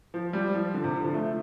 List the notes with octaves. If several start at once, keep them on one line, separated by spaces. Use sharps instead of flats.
F3
G3
F3
D3
C3
D3
F3
A3